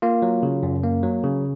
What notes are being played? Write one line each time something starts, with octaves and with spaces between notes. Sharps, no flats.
A#3 F4
F#3
C#3
F#2
A#3
F#3
C#3